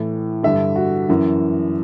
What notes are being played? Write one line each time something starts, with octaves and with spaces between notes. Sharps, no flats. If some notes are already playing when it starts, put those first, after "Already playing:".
Already playing: A2 E3
G2 D3 E5
F#4
F#2 E3